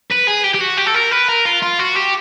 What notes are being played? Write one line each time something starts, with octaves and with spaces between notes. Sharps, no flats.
B4
G#4
G4
G4
F#4
G4
A4
A#4
B4
A#4
F4
F4
F#4
G4